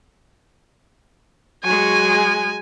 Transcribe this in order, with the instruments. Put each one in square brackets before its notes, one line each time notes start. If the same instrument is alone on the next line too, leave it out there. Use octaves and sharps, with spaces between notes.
[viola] F#3 G#3 [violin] G#5